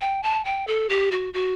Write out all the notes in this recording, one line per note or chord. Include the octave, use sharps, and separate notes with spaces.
G5
A5
G5
A4
G4
F#4
F#4